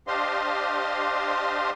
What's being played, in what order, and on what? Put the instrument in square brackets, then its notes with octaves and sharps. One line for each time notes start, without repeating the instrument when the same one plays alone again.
[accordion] D4 G4 C5 D#5 F5 C6